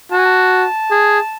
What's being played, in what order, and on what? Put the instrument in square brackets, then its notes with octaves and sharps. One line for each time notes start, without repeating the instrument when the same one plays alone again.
[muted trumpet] F#4 [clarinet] A5
[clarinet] G#5
A5
[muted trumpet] G#4